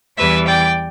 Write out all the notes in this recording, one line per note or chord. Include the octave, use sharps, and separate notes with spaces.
E2 E3 G3 B4 E5
D5 G5